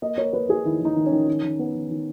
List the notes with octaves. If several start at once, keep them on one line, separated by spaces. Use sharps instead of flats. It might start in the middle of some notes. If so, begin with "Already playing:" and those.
A#3 D#5
A#3 C#5
A#3 B4
A#3 G#4
D#3 E4
D#3 D#4
D#3
C#4
D#3
D#3
D#3
B3
D#3
D#3